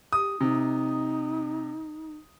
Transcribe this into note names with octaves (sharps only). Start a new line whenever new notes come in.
G4 D#6
C3 D#4